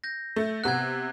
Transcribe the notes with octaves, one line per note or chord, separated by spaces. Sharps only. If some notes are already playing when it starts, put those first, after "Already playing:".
G6 A#6
A3
C3 B3 F#6 G#6